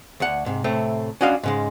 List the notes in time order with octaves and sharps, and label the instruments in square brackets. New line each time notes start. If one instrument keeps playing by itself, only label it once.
[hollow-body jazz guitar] D2 F#5
G#2 C3
A2 C3 A3 C4
C#4 D4 F#4 D#5 F5
G#2 C#3 G#3